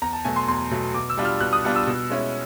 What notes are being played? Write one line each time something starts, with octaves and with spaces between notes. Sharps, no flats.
E2 A#5
A5
B2 F#3 A3 G#5
C6
E2 C6
B2 F#3 A3
B2 D6
E6
G3 B3 D4 F4
F6
B2 F#6
D#6
G3 B3 D4 F4
E6
B2
G#3 C#4 E4